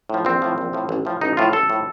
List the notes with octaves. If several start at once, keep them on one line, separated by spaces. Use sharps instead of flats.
A2 F3
A#1 C4
A2 F3
A#1
A2 F3
A1
A2 F3
A1 D#4
A2 F3 F4
A1 A4
A2 F3